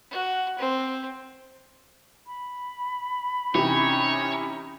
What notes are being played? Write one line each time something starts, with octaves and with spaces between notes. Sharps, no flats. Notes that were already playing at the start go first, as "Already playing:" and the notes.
F#4
C4
B5
C3 E3 C#4 D#4 C#5